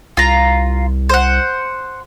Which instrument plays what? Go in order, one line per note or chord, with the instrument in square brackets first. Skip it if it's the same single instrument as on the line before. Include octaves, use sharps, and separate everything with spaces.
[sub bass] C2 [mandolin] F4 A#5
[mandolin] C5 F#5